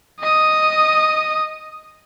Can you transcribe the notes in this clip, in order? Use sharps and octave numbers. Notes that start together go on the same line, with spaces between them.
D#5 D#6